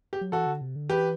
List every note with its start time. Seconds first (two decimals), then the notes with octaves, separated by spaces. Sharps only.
0.13 G4
0.21 F#3
0.32 E3 F#4 A4
0.46 D3
0.61 C3
0.76 D3
0.90 E3 G4 B4